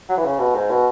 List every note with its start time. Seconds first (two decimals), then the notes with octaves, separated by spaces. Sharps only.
0.09 F#3
0.17 E3
0.24 C#3
0.39 B2
0.55 G#2
0.70 B2